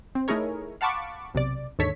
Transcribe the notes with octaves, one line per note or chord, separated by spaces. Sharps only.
C4
A3 D#4 E4 G#4 A#4 C#5
F5 F#5 A5 B5 C#6 D6
B1 C3 D5
D#2 G#2 D3 A4 C#5 B6